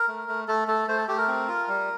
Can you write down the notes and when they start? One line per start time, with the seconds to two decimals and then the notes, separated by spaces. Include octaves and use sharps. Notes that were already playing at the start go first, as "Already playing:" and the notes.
Already playing: A#4
0.08 A3
0.28 A3
0.48 A3 A4
0.68 A3 A4
0.88 A3 C5
0.97 A4
1.08 A3 G4
1.18 A#4
1.27 C4
1.48 F4
1.68 G3